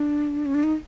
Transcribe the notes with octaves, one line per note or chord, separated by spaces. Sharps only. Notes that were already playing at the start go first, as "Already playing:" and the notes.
Already playing: D4
C#4
D4
D#4